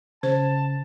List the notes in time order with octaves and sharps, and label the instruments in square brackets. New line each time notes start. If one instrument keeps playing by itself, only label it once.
[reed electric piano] C#3 [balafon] C5 [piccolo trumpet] A5